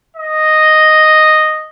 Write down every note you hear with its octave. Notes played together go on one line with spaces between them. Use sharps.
D#5